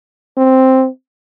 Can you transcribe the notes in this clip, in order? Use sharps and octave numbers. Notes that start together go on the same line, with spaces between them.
C4